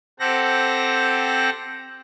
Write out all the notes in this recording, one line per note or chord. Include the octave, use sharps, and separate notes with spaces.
C4 G4 A4 C5 F#5 A#6